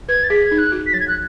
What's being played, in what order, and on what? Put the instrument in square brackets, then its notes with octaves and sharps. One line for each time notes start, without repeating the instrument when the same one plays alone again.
[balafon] B4 [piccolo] G#6
[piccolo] A6
[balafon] G#4 [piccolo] B6
[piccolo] G#6
[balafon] D#4
[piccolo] F#6
[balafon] F#4
[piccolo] B6
[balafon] F#3 [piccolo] A6
[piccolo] G#6
F#6